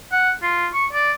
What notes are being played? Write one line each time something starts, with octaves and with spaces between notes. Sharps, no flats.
F#5
F4
C#6
D5